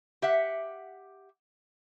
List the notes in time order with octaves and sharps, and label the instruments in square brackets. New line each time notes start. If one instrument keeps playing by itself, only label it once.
[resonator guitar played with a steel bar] G4 E5 F#5